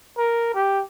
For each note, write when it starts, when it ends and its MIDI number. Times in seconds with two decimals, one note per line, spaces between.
0.18 0.51 70
0.54 0.82 67